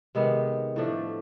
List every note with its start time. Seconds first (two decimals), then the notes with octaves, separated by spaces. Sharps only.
0.15 C3 D#3 G#3 B3
0.76 A2 F3 A3 D4